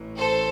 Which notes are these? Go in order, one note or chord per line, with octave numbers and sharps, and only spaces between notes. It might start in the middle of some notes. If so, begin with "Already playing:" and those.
Already playing: A1 A2 E3
A4 C5